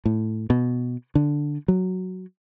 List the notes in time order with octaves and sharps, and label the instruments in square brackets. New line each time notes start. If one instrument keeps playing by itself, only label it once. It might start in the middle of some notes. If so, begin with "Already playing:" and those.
[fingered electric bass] A2
B2
D3
F#3